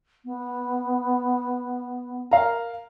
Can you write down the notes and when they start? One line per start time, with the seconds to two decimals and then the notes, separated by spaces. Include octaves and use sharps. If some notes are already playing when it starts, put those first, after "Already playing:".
0.25 B3
2.31 A#4 F5 A#5